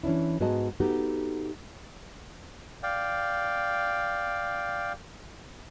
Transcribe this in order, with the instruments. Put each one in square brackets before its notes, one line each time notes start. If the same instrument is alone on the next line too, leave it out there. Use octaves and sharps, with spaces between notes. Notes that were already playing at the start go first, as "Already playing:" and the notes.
[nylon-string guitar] E3 C#4 D4 E4
G#2 B3 F#4 G#4 D#5 A5
B3 D#4 F#4 G4 A4
[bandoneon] D5 F5 G5